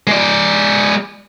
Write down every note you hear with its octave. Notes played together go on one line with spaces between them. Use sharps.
G#3 D5